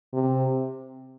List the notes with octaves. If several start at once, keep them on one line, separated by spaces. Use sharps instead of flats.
C3